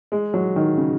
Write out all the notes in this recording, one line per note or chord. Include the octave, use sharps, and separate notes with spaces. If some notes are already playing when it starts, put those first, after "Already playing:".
G#3
F#3
D#3
C#3